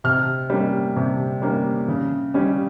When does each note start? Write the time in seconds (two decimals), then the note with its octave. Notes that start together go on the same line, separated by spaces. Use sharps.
0.04 C3 F6
0.50 G3 A#3 C#4
0.96 C3
1.42 G3 A#3 C#4
1.88 C#3
2.34 G3 C#4